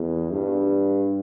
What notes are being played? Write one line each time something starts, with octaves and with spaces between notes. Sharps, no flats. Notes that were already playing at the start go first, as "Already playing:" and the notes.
Already playing: E2
G2